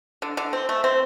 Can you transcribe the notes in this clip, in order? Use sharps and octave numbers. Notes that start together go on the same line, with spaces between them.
D3
D3
C4
A3
C4